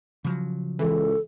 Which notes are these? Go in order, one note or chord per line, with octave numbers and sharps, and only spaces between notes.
C#3 F3 F#3
C#2 E3 A4